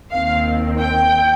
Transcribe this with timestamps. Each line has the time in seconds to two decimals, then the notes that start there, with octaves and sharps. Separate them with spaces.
0.11 D#2 D#3 C4 F5
0.79 G5